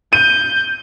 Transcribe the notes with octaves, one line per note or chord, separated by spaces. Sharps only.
G6 D#7